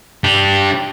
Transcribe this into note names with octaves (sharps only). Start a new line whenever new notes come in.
D4 G4